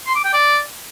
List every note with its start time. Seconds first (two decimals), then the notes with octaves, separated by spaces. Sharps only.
0.07 C6
0.16 D6
0.24 G5
0.33 D5